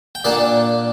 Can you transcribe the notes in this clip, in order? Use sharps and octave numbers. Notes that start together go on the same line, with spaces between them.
G5
A#2 A#3 D4 D5 F#5